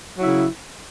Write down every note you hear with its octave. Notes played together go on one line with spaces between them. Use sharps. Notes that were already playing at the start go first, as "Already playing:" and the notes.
C#3 F#3 E4